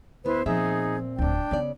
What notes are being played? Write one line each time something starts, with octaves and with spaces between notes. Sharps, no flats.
D2 B3 E4 B4 C5
A#2 F3 C4 D#4 G#4 E5
D1 D2 D4 G5
C#3 B3 D#4 D5